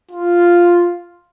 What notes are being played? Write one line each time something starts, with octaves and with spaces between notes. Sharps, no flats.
F4